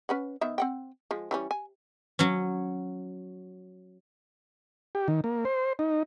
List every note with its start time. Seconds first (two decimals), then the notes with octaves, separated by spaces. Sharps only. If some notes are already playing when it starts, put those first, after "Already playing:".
0.09 C#4 B4 F#5
0.41 D#3 B3 E5
0.58 C4 F#5 G5
1.11 F3 G#3
1.31 E3 G3 C#4
1.51 G#5
2.19 F#3 C#4
4.95 G4
5.08 D#3
5.24 A#3
5.45 C5
5.79 D#4